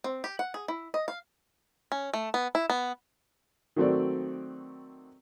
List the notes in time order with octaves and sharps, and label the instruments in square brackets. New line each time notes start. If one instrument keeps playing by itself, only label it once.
[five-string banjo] C4
G4
F#5
G#4
E4
D#5
F5
C#4
A3
B3
E4
B3
[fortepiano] D#3 F#3 A3 C4 F#4 D5